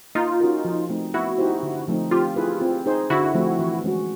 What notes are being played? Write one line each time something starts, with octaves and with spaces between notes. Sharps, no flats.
A#3 D#4 F4
C#4 F#4 A#4
F3
A3 C4 D#4
B3 E4 F#4
D#4 G4 C5
D3
F3 A3 C4 D#4
C4 F4 G4
E4 G#4 B4
C4
D#4 G#4 C5
D3 E4 F#4
F3 A3 C4
E3
G#3 C#4 F#4